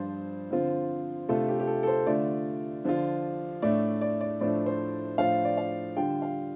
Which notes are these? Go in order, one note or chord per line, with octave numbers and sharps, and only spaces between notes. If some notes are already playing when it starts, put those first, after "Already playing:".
Already playing: G2 F3 D4 F4 C5
D3 F3 C4 F4
C3 A3 D4 F4 A4
G4
G4
A4
A4
C5
D3 A3 F4 D5
D3 F3 D4 F4
A2 A3 D4 D5
D5
D5
A2 F3 A3 D4 D5
C5
A2 F3 D4 F4 F5
D5
F5
D3 G3 D4 F4 G5
F5